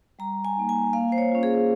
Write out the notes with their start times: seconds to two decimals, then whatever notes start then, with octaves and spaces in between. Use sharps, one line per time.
0.19 G3 A#5
0.45 G#5
0.56 A#3 D#4
0.69 G#5
0.93 A#3 F5
1.12 C5
1.18 C#5
1.32 C#4 F4
1.43 G#4